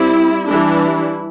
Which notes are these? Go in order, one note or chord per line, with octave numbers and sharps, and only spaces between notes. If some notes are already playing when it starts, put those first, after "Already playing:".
Already playing: G3 C4 E4
E3 G3 D4 E4